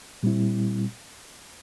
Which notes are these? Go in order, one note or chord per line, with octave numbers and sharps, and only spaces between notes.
A#2 G3 C4 E4